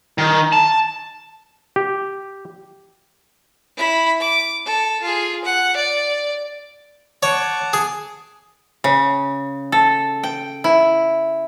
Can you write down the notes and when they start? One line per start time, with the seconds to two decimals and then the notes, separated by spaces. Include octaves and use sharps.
0.18 D#3
0.53 A5
1.76 G4
3.77 E4 B5
4.20 D6
4.65 A4
5.02 F4 G#4
5.44 F#5
5.76 D5
7.23 C#5 F#5 A5 D6
7.73 G#4
8.84 C#3
9.72 A4
10.23 G5
10.64 E4